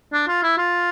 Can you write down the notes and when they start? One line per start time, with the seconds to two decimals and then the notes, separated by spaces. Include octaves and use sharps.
0.13 D4
0.28 F4
0.43 E4
0.58 F4